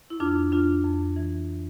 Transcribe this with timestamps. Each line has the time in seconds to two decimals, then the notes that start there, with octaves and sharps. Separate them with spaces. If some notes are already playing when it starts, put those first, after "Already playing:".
0.10 E4
0.20 F2 D4 F4
0.52 F2 D4 F4
0.84 F2
1.16 E3